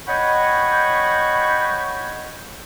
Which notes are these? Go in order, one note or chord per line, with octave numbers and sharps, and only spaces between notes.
C#5 D#5 F#5 G5 B5 C#6